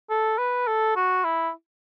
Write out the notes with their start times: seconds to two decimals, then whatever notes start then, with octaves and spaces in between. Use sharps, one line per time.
0.10 A4
0.38 B4
0.67 A4
0.96 F#4
1.25 E4